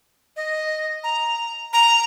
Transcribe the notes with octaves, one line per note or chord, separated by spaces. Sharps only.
D#5
A#5
A#5